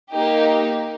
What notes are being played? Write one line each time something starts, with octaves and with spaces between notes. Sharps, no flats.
A#3 D#4 G4